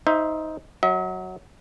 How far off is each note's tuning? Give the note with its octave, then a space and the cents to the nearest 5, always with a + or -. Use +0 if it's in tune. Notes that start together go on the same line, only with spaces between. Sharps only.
D#4 +15 C5 +0 E5 +0
F#3 +0 E5 -45